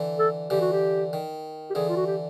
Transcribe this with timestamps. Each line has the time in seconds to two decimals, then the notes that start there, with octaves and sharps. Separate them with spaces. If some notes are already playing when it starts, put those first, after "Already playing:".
Already playing: D3 E3
0.19 A4
0.50 D3 E3 G4
0.61 F#4
0.73 G4
1.13 D#3
1.70 G4
1.75 D3 E3 G#4
1.89 F4
1.97 F#4
2.06 G4